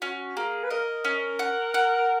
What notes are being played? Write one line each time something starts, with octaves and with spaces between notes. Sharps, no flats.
C#4 F#4
A#3 G#4
B4
A#4 D#5
C#4
F#5
F#5